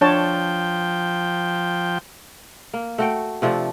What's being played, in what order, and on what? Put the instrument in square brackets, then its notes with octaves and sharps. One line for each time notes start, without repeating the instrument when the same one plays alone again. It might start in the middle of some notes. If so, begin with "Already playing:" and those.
[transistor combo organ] F3 G5 [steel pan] D4 C#5 A5
[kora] A#3
A3 F#4 G5
C3 F3 A3 D4